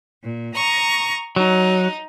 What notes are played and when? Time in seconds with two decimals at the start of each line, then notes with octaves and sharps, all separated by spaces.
0.24 A#2
0.54 A#5 C#6 D#6
1.36 F#3 D#4